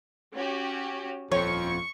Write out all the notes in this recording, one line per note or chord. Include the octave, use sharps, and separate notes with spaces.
C#4 F#4 G4
D#1 F2 F3 C#5 C#6